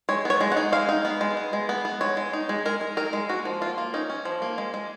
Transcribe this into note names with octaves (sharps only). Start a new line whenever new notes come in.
G#3 C#5
B3 C#5
G#3
F#5
D#4
G#3 F5
D#4
B3
G#3
B3
G#3
B3
B3
G#3 C#5
G#3
D#4
G#3
G#3 A#4
G#3
D#4 A#4
G#3
A#3 F#4
F3
A#3 F4
A#3
C#4 D#4
C#4
F3
A#3
G#3
G#3